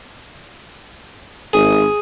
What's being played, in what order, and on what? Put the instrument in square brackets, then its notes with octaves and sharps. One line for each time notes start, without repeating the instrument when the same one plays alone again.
[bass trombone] G#1 [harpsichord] G#4